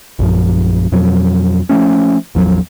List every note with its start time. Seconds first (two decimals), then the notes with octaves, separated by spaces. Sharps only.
0.19 A#1 F#2 F3
0.92 F2 B2 F3 F#3
1.69 F3 F#3 A3 C#4
2.35 A1 E2 F3 F#3